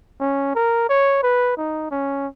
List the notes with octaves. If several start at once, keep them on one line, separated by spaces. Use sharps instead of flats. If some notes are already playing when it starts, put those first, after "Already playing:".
C#4
A#4
C#5
B4
D#4
C#4